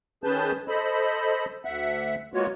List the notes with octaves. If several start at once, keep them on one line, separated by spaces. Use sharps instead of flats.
D#3 C#4 G#4 B4 A5 G6
A4 C5 D#5 B5
D2 E5 F#5
G#3 A#3 B3 F4 F#4 C#5